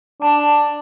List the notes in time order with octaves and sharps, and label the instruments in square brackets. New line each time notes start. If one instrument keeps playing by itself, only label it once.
[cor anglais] D4 [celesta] A5